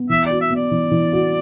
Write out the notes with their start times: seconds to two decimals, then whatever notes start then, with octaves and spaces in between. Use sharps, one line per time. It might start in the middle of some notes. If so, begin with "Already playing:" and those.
Already playing: B3
0.09 E3 E5
0.26 F#4 D5
0.41 E5
0.50 B3
0.55 D5
0.71 E3
0.91 E3
1.12 F#4